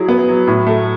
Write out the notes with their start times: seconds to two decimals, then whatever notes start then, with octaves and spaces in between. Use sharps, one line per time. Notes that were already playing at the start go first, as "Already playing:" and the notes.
Already playing: F#3 E4 G#4
0.08 B3
0.29 F#3
0.47 A2
0.67 A3